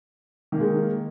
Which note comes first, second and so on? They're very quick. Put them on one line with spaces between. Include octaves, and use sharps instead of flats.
D#3 A#3 G#3